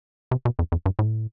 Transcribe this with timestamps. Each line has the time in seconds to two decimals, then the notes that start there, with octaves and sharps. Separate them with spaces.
0.31 C3
0.45 B2
0.59 F2
0.72 F2
0.86 G2
0.99 A2